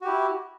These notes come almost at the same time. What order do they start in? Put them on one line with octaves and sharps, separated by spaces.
F#4 G4 E4